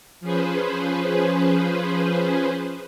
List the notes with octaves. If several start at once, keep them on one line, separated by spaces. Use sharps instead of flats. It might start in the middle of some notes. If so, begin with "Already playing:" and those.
F3 C#4 G#4 B4 C5